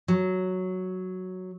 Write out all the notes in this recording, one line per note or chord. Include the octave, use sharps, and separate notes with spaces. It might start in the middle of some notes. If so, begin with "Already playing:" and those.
F#3